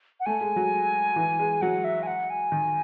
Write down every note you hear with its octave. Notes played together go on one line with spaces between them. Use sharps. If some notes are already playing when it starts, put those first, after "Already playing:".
F#5
A3 G#5
G#3
F#3
E3
G#3
F#3 F#5
E5
G#5
F#5
G#5
D#3